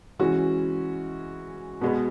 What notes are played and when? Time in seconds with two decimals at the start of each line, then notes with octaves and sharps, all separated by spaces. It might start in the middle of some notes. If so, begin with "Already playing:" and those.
0.19 E3 G#3 C#4 F#4
1.81 B2 G#3 B3